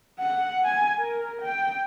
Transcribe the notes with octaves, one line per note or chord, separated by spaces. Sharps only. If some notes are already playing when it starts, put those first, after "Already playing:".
F#5
G#5
A#4
G5